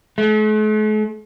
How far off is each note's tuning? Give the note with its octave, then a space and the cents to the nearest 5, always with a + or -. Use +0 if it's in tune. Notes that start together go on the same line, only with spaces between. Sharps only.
A3 -45